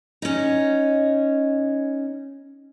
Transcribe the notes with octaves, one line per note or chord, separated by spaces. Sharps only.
C#4 D#4